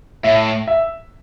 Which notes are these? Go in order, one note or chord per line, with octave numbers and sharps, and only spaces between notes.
A2 E5
E5